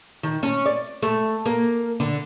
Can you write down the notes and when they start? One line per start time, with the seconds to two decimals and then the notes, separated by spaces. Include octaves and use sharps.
0.23 D#3
0.43 C#4
0.66 D5
1.02 A3
1.46 A#3
2.00 D3